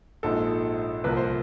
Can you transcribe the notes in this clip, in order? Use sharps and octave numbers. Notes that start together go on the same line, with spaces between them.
A#1 G#2 F3 G#3 A4
C2 A#2 F3 B4
C5